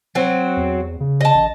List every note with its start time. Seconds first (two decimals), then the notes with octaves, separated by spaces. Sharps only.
0.15 F#3 C4
0.57 E2
1.00 C#3
1.21 D#5 A5
1.34 A1